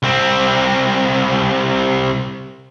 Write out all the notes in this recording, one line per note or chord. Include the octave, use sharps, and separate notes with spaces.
C2 C4